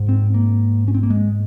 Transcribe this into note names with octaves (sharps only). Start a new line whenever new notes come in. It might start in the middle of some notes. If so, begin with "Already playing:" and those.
Already playing: G#2
C4
A#3
C#4
C4
A#3
G#3